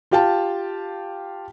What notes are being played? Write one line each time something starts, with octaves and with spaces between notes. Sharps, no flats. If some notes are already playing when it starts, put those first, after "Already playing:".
F4 G4 F5 G5 A5